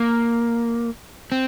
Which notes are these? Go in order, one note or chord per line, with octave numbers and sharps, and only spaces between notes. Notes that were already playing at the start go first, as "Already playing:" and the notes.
Already playing: A#3
C4